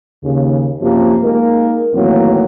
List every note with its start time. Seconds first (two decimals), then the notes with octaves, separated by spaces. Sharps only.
0.24 D#2 C#3
0.81 F#2 C3 F3 A#3 G4
1.23 G#3 A#3 D#4 A#4
1.94 D#2 A2 E3 F#3 A#3 C4